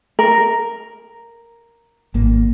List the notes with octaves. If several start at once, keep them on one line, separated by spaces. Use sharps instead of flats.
A#4
G#1 A#3